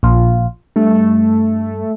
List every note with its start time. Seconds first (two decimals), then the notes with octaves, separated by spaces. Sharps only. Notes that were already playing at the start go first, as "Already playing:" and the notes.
0.03 A#1 F4
0.76 G2 A3